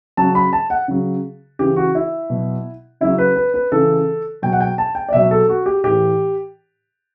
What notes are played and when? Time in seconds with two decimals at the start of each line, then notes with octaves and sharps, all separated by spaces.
0.17 C#3 F#3 A5
0.35 B5
0.53 A5
0.70 F#5
0.88 C#3 F#3
1.59 C#3 E3 G4
1.76 F#4
1.95 E4
2.30 B2 F#3
3.01 C#3 F#3 E4
3.18 B4
3.36 B4
3.54 B4
3.72 C#3 E3 A4
4.42 B2 F#3 G5
4.53 F#5
4.61 G5
4.78 A5
4.95 G5
5.09 D5
5.13 B2 F#3 E5
5.31 A4
5.49 F#4
5.66 G4
5.84 A2 E3 G4